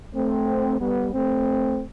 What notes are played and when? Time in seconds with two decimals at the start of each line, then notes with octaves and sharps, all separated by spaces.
0.15 A3 C4
0.80 G3 B3
1.13 A3 C4